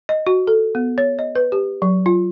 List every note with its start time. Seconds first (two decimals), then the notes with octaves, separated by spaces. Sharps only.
0.09 D#5
0.27 F#4
0.47 A4
0.75 B3
0.98 C#5
1.19 D#5
1.35 B4
1.52 G4
1.82 F#3
2.06 F4